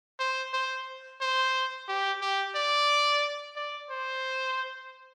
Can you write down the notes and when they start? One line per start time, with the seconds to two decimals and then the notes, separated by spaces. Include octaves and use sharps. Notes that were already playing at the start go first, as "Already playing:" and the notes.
0.19 C5
0.53 C5
1.21 C5
1.88 G4
2.21 G4
2.56 D5
3.56 D5
3.90 C5